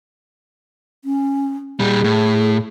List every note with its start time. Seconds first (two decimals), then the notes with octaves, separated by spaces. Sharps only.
1.05 C#4
1.80 A#2 G3 G#4
2.04 A2